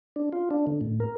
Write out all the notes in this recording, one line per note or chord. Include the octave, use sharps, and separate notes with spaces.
D4
F4
D4
D3
A2
A#4